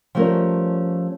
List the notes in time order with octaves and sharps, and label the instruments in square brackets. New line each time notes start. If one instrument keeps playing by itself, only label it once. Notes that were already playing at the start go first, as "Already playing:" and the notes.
[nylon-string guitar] F3 G3 A3 C#4 A#4